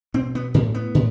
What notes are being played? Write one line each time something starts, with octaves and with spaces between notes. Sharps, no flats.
B2 C4
B3
A2 A#3
B3
A2